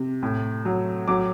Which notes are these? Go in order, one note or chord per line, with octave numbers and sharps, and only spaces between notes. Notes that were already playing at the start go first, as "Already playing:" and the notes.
Already playing: C3
A2
F#3
F#3 D6